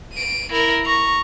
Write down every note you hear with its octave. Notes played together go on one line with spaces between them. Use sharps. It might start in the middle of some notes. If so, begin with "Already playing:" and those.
D7 D#7
E4 A#4
A#5 C#6